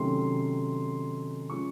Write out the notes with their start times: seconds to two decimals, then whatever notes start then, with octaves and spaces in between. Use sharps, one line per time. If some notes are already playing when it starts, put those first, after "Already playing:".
Already playing: C3 D#3 F#3 A3 C#4 C6
1.50 F3 G#3 C#4 C#6